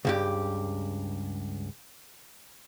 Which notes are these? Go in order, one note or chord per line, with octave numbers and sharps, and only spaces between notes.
C#2 G2 G4